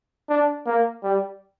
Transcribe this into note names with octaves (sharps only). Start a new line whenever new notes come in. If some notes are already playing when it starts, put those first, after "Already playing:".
D4
A#3
G3